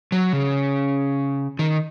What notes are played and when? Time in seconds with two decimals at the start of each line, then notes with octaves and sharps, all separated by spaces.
0.12 F#3
0.33 C#3
1.59 D#3